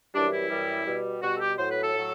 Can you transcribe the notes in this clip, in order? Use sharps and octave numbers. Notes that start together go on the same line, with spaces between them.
F#2 E3 G3 D4
E4
F#2 E3 G3
B2 G3
B2 G3 F#4
A4
G4
A2 F#3 C5
B4
A4
A2 F#3